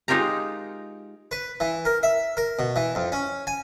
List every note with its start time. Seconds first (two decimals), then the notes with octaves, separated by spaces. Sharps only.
0.08 G#3 D#4 F4 G4 A#4 A#5
1.31 B4
1.60 E3
1.85 A#4
2.03 E5
2.37 A#4
2.59 B2
2.76 E3
2.95 F2
3.12 C#4
3.47 G#5